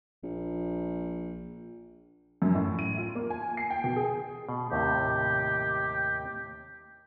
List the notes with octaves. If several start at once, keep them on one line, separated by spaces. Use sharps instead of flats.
A#1
F#2
A2
D#7
F4
A#3
G#5
C7
G5
B2
G#4
B2
D#2 A2 C3 G4